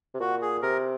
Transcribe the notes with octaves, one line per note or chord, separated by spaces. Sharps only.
C3
A#2 F#4
G#4
C3 A#4